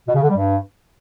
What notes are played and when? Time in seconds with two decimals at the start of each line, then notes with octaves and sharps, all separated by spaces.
0.08 B2
0.15 C#3
0.22 D3
0.29 G3
0.36 G2